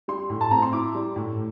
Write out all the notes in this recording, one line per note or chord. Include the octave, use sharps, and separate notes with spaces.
G3 C6
A2
A5
C4 A#5
C6
E4 D6
G3
A2